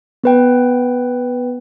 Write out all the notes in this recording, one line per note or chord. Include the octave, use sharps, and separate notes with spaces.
B3 B4 G5